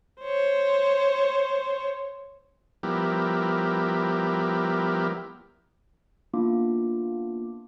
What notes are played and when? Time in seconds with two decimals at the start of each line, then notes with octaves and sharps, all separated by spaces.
0.22 C5 C#5
2.83 F3 G3 B3 E4 G4 A#4
6.34 A#3 B3 D4 E4 F4 D6